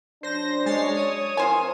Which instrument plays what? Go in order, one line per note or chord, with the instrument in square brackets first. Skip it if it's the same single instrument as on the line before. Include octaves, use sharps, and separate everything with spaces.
[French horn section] F#3 C#4 D4 [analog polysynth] C5 A#6
[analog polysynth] G#3 A6 C7 [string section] C#5
[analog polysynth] D#6
[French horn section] F3 C4 A#4 [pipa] F4 C5 G#5